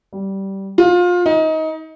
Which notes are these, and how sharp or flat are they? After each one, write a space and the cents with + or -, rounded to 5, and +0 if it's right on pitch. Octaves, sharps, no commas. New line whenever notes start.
G3 -15
F4 +25
D#4 +25